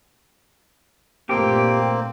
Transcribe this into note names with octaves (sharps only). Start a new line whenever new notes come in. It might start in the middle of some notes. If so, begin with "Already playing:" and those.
G2 A#2 A3 A#3 C4 G4 G5 D6